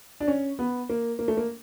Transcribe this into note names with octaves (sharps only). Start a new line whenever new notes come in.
D4
C#4
B3
A#3
A#3
A3
A#3